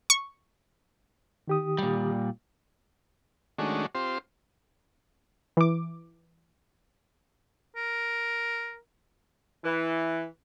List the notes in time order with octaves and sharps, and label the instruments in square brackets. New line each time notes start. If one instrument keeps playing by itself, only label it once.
[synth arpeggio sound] C#6
[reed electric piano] D#3 G4 D#6
[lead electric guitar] A#2 G3
[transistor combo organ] D#3 G#3 A3 C#4 D4 F#4
C4 F4 G4 C5
[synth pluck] E3 D6
[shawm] A#4
[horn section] E3